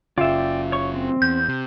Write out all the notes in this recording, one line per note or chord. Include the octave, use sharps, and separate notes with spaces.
F#1 C#3 F4 D5 E5 G5
C#5 C#6
C4
E2 G6
C3